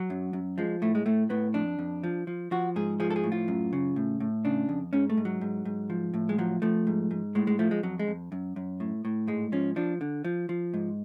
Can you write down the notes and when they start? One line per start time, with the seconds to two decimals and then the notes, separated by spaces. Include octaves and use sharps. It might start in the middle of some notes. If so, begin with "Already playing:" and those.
Already playing: F#3
0.10 F#2
0.33 F#2
0.58 F3 G#3
0.82 A2 A3
0.95 G#3
1.06 A2 A3
1.30 A2 B3
1.54 F2 D4
1.79 F2
2.03 F3
2.27 F3
2.51 F3 F#4
2.76 G#2 G#4
3.00 F3 G#4
3.10 A4
3.16 G#4
3.24 A2
3.32 F4
3.48 F#2
3.73 C#3
3.96 A2
4.20 A2
4.45 C#3 D4
4.69 F2
4.93 G#2 C#4
5.10 A3
5.17 G#2
5.25 F#3
5.41 G#2
5.65 G#2
5.90 F3
6.14 A2
6.29 G#3
6.38 F3 F#3
6.62 F3 A3
6.87 G#2
7.11 G#2
7.35 A2 G#3
7.47 G#3
7.59 F3 A3
7.71 G#3
7.83 F2 F#3
7.99 G#3
8.07 F2
8.32 F#2
8.56 F#2
8.80 A2
9.05 A2
9.27 G#2 G#3
9.52 F3 C#4
9.76 F3 D4
10.01 D3
10.24 F3
10.49 F3
10.74 G#2